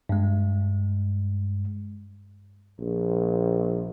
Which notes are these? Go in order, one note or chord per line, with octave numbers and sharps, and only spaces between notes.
G2 G#3
A#1